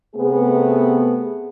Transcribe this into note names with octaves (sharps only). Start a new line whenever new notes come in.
C3 A3 B3 G#4